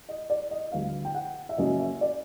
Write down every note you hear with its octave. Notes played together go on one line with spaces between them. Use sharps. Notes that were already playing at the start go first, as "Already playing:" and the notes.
D#5
D5
D#5
D2 D3 G3 B3 F5
G5
F#5
E5
F#2 C#3 F#3 A#3 C#4 D#5
E5
D5